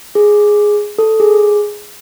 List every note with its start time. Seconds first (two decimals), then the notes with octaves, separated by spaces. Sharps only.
0.15 G#4
0.98 A4
1.20 G#4